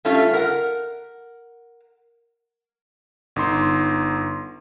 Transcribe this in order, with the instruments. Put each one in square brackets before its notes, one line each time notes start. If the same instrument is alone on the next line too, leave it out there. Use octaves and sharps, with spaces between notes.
[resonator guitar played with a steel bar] G3 A3 C#4 F4
A#4 F#5
[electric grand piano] G1 D#4 C6